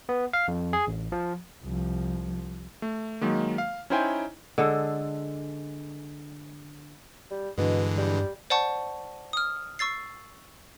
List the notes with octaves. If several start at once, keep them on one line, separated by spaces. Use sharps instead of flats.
B3
F5
F2
G#4
A1
F3
C2 F3
A3
D#3 F#3 G#3 A#3
F5
C#4 D#4 E4 C5 G5 G#5
D3 G#3 A4
G3
G2 B2 D3 E3 G#3
G3
C5 D5 F#5 A5 C#6
D#6 F6
C#6 E6 A6 C7